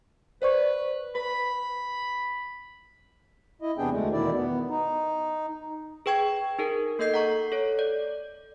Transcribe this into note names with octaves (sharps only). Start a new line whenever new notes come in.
B4 C5 D5 C#6
B4 B5
E4 D#5
E2 C3 B3 D4 G#4 G5
D2 G#3 A3
E2 B2 D#3 E4 D5
B3
D#4
G#4 B4 G5 C#6 G#6
D#4 G#4 A#4
A#3 A4 D#5 G6 C7
F#5 A#5 C#6
A4 C#5
D5